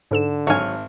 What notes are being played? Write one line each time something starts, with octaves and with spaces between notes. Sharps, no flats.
G#2 D3 A4 E7
G#1 F#3 G#5 F6